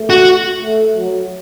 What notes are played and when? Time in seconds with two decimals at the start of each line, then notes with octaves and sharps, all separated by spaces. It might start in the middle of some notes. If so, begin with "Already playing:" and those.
Already playing: A3
0.10 F#4
0.62 A3
0.97 F#3